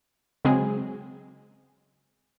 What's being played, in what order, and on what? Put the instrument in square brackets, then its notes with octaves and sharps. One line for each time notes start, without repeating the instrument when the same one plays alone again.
[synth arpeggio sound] C#3 F#3 G#3 C4 G#4